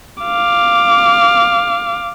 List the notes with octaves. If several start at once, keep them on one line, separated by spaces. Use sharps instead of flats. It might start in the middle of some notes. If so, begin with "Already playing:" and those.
F5 D6